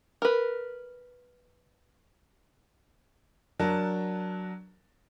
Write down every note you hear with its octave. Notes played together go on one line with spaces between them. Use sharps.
A#4 B4
F#3 D4 A#4 A5